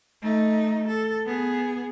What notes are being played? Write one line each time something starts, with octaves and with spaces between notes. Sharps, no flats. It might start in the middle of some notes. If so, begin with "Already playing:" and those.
A3 D#4
A4
B3 G#4